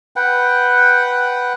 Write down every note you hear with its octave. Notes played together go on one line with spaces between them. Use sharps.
B4 F#5 G5